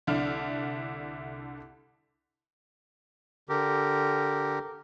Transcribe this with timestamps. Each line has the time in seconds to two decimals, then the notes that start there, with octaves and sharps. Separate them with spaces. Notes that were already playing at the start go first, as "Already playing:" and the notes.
0.07 C2 D3 D4 E4 F6
3.49 D3 G4 A#4